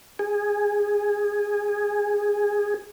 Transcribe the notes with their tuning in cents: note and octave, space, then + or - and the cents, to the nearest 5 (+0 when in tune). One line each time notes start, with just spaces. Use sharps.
G#4 -10